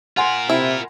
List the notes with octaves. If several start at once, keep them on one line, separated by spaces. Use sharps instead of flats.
F4 A#4 F#5 G#5 C6
C3 E4